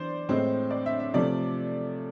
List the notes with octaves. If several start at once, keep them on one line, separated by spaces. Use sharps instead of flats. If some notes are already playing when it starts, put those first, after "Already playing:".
Already playing: E3 D4 C5 D5
A2 G#3 C4
D5
E5
E5
C3 F3 A3 D5